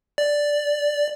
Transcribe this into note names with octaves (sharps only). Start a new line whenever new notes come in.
D5